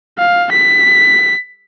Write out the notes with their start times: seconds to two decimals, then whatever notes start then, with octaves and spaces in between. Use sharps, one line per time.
0.18 F5
0.52 B6